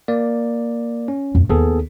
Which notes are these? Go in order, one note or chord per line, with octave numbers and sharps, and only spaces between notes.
A#3 D5
C#4
F2 A3
D#2 B3 G#4 A4